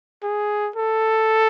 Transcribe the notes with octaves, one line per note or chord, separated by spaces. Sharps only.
G#4
A4